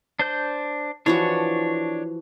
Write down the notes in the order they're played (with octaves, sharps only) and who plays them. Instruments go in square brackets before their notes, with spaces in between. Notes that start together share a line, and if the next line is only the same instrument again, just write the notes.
[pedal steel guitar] D4 C5 G6
[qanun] E3 F3 F#4 [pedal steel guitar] D4 C#5